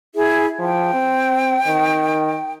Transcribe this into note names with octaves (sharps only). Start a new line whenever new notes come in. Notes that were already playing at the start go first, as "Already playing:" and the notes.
E4 G#4 E5
F3 G5
C4
D#3